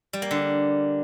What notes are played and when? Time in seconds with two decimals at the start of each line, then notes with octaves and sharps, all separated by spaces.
0.13 G3
0.22 A#3
0.31 D3